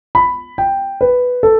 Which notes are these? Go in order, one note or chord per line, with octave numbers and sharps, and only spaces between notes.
B5
G5
B4
A4